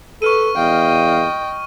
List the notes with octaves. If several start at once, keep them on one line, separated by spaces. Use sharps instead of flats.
A4 B4 C#6 F6 D#7
E2 D#5 F5 G5